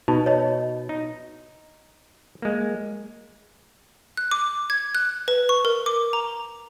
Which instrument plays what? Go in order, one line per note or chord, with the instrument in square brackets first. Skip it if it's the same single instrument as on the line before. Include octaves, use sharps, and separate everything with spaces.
[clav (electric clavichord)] B2 [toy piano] D#4
[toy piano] C#5 D#5
[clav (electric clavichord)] D#4
G#3 A#3
[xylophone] F#6
D6
G#6
F#6
B4
C#6
A#4
D6
A#5